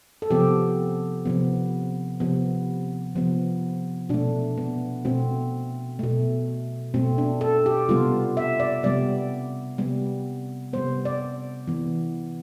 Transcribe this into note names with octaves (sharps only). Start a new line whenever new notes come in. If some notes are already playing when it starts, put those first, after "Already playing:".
A4
C3 F3 B3 G4
C3 F3 B3
C3 F3 B3
C3 F3 B3
B2 A3 D4
B3
B2 A3 C4
B2 A3
B2 A3 C4
D4
A4
G4
C3 G3 B3 F4
E5
D5
C3 G3 B3 D5
C3 G3 B3
C3 G3 B3 C5
D5
E3 B3